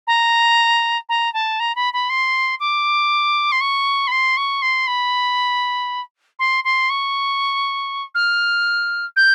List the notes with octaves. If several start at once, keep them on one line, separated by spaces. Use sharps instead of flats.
A#5
A#5
A5
A#5
B5
B5
C6
D6
C6
C#6
B5
C6
C#6
C6
B5
C6
C6
C#6
F6
G6